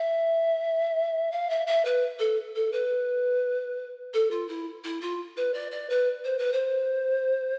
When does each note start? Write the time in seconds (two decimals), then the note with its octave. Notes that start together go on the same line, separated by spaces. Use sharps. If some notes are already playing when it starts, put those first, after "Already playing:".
Already playing: E5
1.31 F5
1.50 E5
1.66 E5
1.85 B4
2.19 A4
2.55 A4
2.72 B4
4.13 A4
4.30 F4
4.48 E4
4.84 E4
5.01 F4
5.37 B4
5.54 D5
5.71 D5
5.89 B4
6.24 C5
6.38 B4
6.52 C5